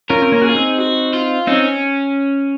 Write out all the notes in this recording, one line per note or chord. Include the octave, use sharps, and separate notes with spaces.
C#4 F4 A#4
C4
A#3 C#4
F#4 G#4
F4
C4 D#4
F#4
F4
C4 C#4 D#4